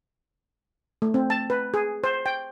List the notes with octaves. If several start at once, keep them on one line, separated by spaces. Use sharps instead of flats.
A3
C4
A5
B4
G#4
C5
G5